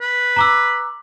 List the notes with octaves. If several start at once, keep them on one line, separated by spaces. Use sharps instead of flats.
B4
A#5 D6 E6